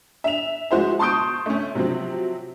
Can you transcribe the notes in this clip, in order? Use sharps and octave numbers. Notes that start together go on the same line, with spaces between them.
E5 F7
F3 G#3 F#4 C5 E5
A5 C6 C#6 D#6 G6 D7
A3 C#4
C3 F3 F#3 C4